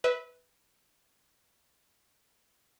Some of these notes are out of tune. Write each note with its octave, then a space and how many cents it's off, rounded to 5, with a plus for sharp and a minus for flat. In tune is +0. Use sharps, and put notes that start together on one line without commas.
B4 +0 E5 -30